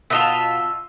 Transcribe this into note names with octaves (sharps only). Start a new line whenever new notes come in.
B2 F4 D#5 E5 A5